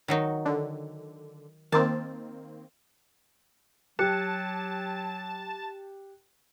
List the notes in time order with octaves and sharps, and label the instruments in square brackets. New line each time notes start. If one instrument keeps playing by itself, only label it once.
[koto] D#3 F#3 D#4
[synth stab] D3
[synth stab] D#3 A#3 C4 [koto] A5
[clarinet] F#3 [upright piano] G4 [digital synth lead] A5 [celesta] F#6 C#7